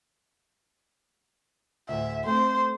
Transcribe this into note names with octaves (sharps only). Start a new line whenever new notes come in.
D2 A2 E5
A3 C4 C5